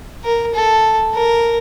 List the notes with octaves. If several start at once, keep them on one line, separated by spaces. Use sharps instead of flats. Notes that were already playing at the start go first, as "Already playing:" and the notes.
A#4
A4
A#4